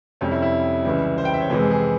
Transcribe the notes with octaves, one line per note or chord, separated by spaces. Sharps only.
F2 C3 G3 C#4
E4
E4
C#2 C#3 E3 G3
C5
G5
E5
C#5
F2 C3 E3 G#3 C5
G#4
G#4